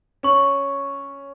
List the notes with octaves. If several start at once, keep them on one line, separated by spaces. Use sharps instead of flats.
C#4 C#6